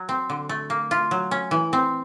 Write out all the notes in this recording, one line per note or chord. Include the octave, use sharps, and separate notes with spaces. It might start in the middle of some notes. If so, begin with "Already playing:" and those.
Already playing: F#3
C4
D3
A3
A#3
F4
F#3
C#4
E3
C4